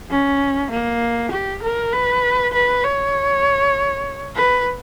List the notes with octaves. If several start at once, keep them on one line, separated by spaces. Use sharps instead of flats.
C#4
A#3
G4
A#4
B4
B4
C#5
B4